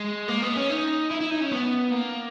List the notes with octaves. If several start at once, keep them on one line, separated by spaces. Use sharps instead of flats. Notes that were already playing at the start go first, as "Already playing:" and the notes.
Already playing: G#3
A#3
B3
C#4
D#4
E4
E4
D#4
C#4
B3
A#3